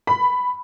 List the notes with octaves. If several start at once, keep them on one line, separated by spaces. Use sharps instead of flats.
B5